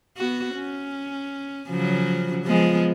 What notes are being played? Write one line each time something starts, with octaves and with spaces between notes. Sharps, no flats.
B3 F#4
C#4
C#3 F3 F#3
F3 G#3 B3